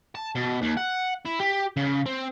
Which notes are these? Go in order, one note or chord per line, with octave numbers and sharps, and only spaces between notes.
A5
B2
D#2
F#5
E4
G4
C#3
C4